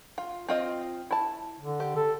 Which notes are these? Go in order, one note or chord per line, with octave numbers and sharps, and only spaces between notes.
F4
C4 F4 D#5
E4 A5
D3
G4
A4